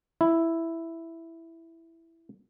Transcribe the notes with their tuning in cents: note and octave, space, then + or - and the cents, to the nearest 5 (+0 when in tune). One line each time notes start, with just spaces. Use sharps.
E4 +0